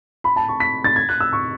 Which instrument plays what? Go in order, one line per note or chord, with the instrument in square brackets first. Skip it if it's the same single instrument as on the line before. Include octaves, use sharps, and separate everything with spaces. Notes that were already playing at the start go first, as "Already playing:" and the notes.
[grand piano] B5
A5
C#6
B6
A6
G#6
F#6
E6
C#6